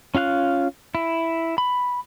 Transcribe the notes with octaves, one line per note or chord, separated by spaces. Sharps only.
C#4 F4 F5 F#6
E4
B5